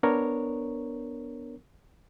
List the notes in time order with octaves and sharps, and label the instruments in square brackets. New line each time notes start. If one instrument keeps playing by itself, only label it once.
[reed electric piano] B3 D4 A#4 C#5